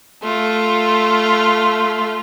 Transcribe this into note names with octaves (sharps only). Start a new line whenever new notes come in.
A3 F4